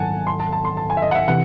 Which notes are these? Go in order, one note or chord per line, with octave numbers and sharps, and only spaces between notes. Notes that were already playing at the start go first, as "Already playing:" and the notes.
Already playing: G#2 D#3 F#3 F#5 G#5 A5
C6
A5
A5
C6
A5
G#5
E5
D#5
F#5
E5
C3 E3 F#5